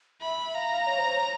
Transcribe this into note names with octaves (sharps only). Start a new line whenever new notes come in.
E5 B5
F5 A#5
F5
C#5
C5
C#5